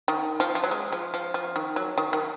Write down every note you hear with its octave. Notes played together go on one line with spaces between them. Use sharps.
D#3
F3
F3
F#3
G#3
F3
F3
F3
D#3
F#3
D#3
D#3